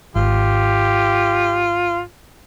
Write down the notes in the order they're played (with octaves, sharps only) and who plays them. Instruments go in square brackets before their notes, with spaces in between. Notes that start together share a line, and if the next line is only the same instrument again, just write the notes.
[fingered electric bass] G#1 [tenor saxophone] F4 [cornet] G4